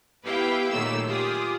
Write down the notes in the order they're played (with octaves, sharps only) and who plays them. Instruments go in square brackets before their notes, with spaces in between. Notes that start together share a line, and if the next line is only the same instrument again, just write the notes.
[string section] B3 E4 G4 B4 F5 G5
A#2 D#3 F#3 A3 A#3 E6
F4 G4 G#4 D6 D#6